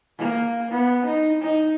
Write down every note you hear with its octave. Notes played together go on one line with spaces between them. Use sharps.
A#3
B3
D#4
D#4